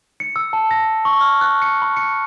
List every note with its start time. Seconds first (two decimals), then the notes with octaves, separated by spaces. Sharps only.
0.20 C#7
0.36 E6
0.53 A5
0.71 A#6
1.05 C#6
1.21 F6
1.41 F#6
1.62 C#7
1.82 B5
1.97 C#7